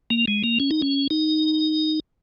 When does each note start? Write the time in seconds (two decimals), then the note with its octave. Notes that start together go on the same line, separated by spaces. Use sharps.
0.10 A#3
0.28 G#3
0.44 A#3
0.60 C#4
0.71 D#4
0.82 C#4
1.10 D#4